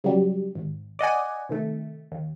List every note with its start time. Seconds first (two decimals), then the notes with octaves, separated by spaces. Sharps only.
0.04 C#3 F#3 G3
0.55 G#1
0.99 D5 D#5 F#5 G#5
1.49 C3 D#3 A3
2.12 D#2